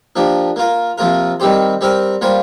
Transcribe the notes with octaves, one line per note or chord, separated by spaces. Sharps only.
F3 A#3 D4 G4
A#3 F4 A#4
C3 F3 A#3 F4 A#4
D#3 G3 C4 G4 C5
G3 C4 G4 A#4
G3 A#3 F4 C5